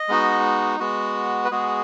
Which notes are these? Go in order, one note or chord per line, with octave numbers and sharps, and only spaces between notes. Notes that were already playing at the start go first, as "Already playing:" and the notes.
Already playing: D#5
G#3 B3 D#4 F#4
G#3 B3 F#4
B4
G#3 B3 F#4 G#4